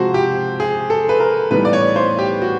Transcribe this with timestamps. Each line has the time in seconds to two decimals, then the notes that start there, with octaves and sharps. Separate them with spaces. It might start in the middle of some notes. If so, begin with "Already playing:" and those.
Already playing: C3 F3 G#3 F#4 C5
0.14 G4
0.60 G#4
0.90 A4
1.09 B4
1.20 A#4
1.51 A2 E3 G3 B3 D#4 B4
1.65 D5
1.73 C#5
1.96 C5
2.19 G4
2.42 F#4